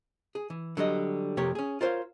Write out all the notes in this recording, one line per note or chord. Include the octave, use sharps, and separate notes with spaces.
G#4
E3
D3 F#3 G3 D#5
F2 C3 A#3 G4 C#5
C#4 G#4
F4 A#4 C5 C#5 F5